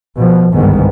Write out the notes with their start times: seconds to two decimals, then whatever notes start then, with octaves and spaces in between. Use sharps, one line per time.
0.16 B2 F3
0.52 G1 C2 G#2 D#3 B3